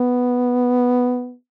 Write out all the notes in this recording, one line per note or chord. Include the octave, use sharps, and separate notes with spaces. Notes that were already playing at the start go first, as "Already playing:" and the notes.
Already playing: B3